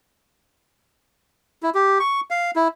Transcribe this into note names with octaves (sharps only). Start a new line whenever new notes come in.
E4
G4
C#6
F5
E4